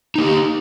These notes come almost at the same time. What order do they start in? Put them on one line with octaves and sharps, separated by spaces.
D#4 A#3 G4